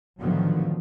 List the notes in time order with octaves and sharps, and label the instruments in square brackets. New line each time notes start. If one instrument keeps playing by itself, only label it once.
[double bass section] A2 D3 D#3 F3 F#3 B3